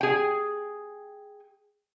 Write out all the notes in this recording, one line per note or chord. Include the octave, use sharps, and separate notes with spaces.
G#4 G5